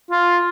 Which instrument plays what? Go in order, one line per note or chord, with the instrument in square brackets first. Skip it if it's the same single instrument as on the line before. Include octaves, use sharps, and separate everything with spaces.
[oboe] F4